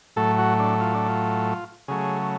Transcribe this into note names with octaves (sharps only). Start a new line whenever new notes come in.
A2 F#3 A3 A4
F#4
D4
F4
D4
F4
C#3 F#3 A3 G#4